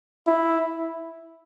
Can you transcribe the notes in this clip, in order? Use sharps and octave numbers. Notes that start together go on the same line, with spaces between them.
E4